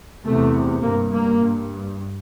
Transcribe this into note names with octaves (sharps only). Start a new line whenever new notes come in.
E2 C3 A3
G2 A#3
A#3
G2